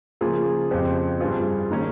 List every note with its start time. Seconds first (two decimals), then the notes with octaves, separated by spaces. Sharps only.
0.21 C#3 F3 A#3 F4 G#4
0.71 F2 C#3 F3 C4 G4
1.20 G2 G3 C4 F4 G#4
1.71 D#3 A#3 C#4 G#4